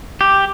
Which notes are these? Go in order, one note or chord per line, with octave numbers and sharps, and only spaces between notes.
G4